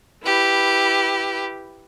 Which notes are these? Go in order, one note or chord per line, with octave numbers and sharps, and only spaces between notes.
E4 G4 B4